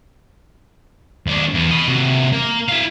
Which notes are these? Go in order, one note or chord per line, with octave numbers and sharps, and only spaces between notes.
D#2 D4
E2
B4 D#5
C3 F#4
A#3
E4 F5